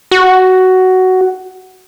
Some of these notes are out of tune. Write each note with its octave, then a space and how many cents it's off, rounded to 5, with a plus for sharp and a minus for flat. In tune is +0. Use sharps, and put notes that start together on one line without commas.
F#4 +10